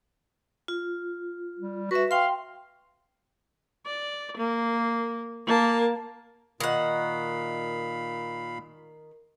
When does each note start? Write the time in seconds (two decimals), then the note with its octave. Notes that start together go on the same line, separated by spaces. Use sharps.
0.68 F4
1.59 G3
1.91 F#4 B4 E5
2.11 F5 G5 C6
3.86 D5
4.37 A#3
5.46 A#3 A5
6.60 A#2 D#3 F5 F#5 B5